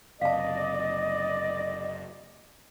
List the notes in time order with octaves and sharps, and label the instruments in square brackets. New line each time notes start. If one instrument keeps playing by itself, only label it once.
[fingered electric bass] F#1 C3 [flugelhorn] D5 [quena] D#5 [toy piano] F5 A5